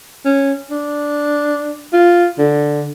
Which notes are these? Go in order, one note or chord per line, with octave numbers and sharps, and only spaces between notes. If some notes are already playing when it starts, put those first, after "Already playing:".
C#4
D4
F4
D3